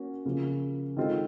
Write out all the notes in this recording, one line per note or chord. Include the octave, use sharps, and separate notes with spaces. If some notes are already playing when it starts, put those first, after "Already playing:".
Already playing: A#3 C#4 F#4
C#3 F3 A#3
D#3 G#3 C4 F4 A4